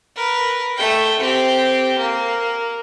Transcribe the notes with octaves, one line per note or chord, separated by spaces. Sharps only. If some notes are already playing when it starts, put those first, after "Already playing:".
A#4 B4
A3 G5
C4 G4
A#3